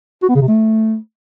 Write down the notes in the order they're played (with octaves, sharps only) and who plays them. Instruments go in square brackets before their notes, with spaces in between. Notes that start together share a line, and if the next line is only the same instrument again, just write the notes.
[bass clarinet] F#4
B3
C#3
C3
A3